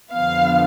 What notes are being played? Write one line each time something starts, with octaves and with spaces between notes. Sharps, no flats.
F2 D3 F3 B3 F5